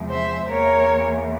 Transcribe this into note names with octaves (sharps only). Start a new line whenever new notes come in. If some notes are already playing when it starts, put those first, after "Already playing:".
Already playing: E2 C3 F3 G#3
C5 E5
E2 E3 A#3 A#4 C#5